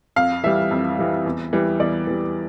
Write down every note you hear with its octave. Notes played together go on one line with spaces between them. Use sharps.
F2 F5
E3 G3 E5
F2
E3 G3
E2
E3 G3
E2 D5
E3 G3